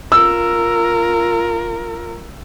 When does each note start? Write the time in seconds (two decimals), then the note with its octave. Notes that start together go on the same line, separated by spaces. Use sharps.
0.12 F4 A#4 E6